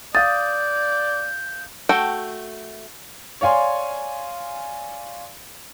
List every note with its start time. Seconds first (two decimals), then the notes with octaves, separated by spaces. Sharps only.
0.15 D5 F5 D#6 G6 A6
1.89 A3 F#4 G5
3.41 C#5 D5 F5 G#5 C6